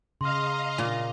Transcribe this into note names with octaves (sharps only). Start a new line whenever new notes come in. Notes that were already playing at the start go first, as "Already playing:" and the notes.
C#3 D#5 F5 A#5 C6 F6
A#2